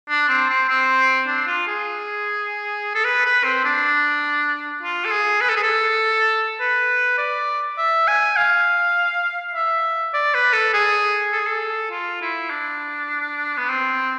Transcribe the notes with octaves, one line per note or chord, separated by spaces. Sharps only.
D4
C4
C4
C4
D4
F4
G#4
A4
B4
B4
C4
D4
F4
A4
G#4
B4
A4
G#4
A4
B4
D5
E5
G#5
F5
E5
D5
B4
A4
G#4
A4
G#4
A4
F4
E4
D4
B3
C4